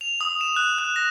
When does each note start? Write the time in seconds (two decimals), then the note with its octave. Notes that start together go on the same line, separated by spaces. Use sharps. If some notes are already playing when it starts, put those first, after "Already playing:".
0.01 F7
0.21 D#6
0.41 E7
0.56 F#6
0.78 F#6
0.96 A#6